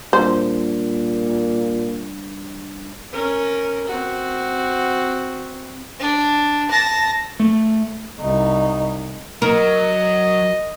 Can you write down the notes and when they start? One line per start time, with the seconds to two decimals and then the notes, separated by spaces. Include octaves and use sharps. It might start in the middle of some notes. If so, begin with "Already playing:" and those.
0.13 A#2 G3 D4 C5
3.12 C#4 A#4
3.86 C4 F#4
6.00 D4
6.71 A5 A#6
7.40 A3
8.19 C2 D#4
9.42 F#3 A#4 D#5